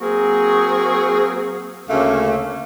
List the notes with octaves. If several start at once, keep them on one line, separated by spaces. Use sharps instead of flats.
F#3 A#3 C4 F#4 G#4
D2 C#3 A3 A#3 C#4 F5